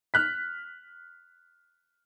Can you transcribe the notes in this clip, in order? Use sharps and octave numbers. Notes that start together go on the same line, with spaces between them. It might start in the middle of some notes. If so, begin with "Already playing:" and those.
F6 F#6 B6